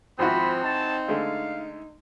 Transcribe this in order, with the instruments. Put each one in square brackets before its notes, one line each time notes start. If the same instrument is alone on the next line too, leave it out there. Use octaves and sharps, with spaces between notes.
[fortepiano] G#1 E4 F#4 [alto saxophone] F3 [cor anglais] C4 [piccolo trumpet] B5
[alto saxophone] D#4 [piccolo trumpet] A5
[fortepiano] D3 G#3 A3 [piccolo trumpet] F5